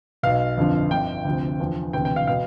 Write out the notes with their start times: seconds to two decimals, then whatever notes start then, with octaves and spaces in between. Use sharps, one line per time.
0.23 B1 B2 F5
0.57 G1 F2 D3 F3
0.91 G1 F2 D3 G5
1.25 D2 C3 F3
1.60 E2 D3 F3
1.93 E1 D2 C3 E3 G5
2.05 G5
2.16 F5
2.27 B2 F5